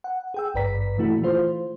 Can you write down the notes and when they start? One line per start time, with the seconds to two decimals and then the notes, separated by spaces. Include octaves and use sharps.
0.04 F#5
0.34 G#4 G5 E6
0.54 G#1 G2 B4 D5 A#5 B6
0.98 A#2 E3 A3 E4 F#4
1.22 E3 A3 F4 C5